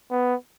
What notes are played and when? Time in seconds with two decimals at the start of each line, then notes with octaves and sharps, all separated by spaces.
0.11 B3